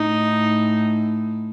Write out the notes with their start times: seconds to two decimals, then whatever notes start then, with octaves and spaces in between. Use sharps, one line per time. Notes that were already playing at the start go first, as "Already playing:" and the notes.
Already playing: A2 D#4